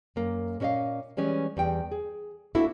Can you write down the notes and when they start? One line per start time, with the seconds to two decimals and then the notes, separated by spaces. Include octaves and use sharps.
0.16 F#2 A#3
0.60 A#2 C#4 C#5 D#5 F5
1.17 E3 G3 G#3 C#4 B4
1.57 E2 G3 G5
1.92 G#4
2.55 A#3 B3 D4 E4 F#4 A4